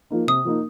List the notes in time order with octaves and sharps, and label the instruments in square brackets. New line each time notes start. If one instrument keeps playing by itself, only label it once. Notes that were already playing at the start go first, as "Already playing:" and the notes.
[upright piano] F3 A#3 D#4
[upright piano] C3 [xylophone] D#6
[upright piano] F3 A#3 D#4